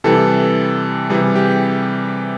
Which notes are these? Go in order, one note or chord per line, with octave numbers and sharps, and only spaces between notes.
C3 E3 G3 A4
C3 E3 G3 G#4
G4